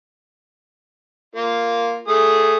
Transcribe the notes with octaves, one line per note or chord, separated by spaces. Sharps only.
A#3 F4
A3 G#4 D#6